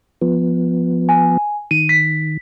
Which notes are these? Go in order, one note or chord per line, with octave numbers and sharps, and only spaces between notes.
F3 B3
G#5
D#3 D#7
B6